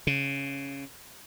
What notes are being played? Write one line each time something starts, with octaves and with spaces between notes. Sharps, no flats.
C#3